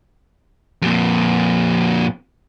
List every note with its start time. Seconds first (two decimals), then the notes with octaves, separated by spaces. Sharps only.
0.82 F2 A#2